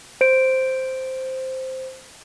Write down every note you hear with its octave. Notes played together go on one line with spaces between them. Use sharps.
C5 D7